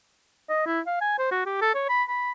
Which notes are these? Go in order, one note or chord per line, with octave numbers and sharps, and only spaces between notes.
D#5
E4
F5
G#5
C5
F#4
G4
A4
C#5
B5
B5